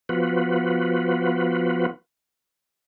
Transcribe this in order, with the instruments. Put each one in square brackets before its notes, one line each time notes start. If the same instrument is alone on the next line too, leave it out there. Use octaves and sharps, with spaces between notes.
[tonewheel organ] F3 B3 F4 F#4 B4